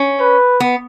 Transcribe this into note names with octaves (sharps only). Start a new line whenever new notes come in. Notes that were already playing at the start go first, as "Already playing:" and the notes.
Already playing: C#4
B4
B3